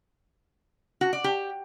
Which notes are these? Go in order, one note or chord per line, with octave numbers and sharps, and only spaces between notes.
F#4
D5
G4